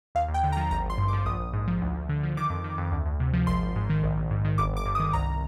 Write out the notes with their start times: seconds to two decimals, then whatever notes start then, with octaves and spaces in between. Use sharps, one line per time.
0.15 D#2 F5
0.28 D#2
0.34 G5
0.44 D3
0.52 A#5
0.57 F3
0.71 G#1 A#5
0.85 G#1 C6
0.98 G2
1.08 D6
1.13 F3
1.26 A#1 D#6
1.40 A#1
1.53 G#2
1.68 F3
1.81 D2
1.96 D2
2.09 D3
2.23 F3
2.37 D#3 D6
2.50 F2
2.64 D#3
2.78 F2
2.91 D2
3.06 D2
3.20 C3
3.33 F3
3.47 G#1 C6
3.62 G#1
3.76 G#2
3.90 D#3
4.03 A#1
4.17 A#1
4.30 G#2
4.45 D#3
4.58 G1 D6
4.72 G1 D6
4.85 G2
4.95 D#6
5.00 D#3
5.13 C2 A#5